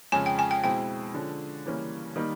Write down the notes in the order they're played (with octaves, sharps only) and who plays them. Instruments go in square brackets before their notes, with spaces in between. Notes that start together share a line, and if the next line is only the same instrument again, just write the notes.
[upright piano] F2 C#3 F3 G#3 C#4 [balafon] G#5
[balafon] G5
G#5
G5
[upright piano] B2 G#3 C4 E4 [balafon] G5
[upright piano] D3 F3 G#3 C#4
C#3 E3 G3 A#3 C#4
D#3 G3 A#3 D#4